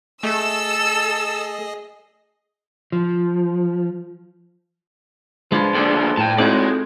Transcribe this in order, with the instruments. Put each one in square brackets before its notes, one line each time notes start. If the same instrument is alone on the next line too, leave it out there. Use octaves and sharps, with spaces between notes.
[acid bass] A3 [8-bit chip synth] G#4 D#5 [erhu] A4 [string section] E6
[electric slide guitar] F3
[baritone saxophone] F3 [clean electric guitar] G#3 D4 F4 [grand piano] B4 B5 G#6
[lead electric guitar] D#2 D3 [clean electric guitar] G#4 A4 D5
[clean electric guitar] A2 [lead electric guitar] G5 A5
[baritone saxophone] A2 [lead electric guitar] G#3 [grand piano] C4 D#4 F4 [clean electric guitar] F#4 D5